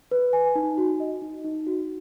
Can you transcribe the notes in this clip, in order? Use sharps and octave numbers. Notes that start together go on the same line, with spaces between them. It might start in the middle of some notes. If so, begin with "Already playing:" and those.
B4
G#5
D#4
F#4
D#5
D#4
D#4
F#4